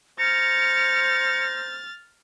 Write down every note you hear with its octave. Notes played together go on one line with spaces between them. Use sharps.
C5 A#5 F6 A6 C#7